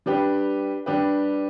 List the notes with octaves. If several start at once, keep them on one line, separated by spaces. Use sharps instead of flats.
G3 D4 G4 B4
G3 D4 G4 B4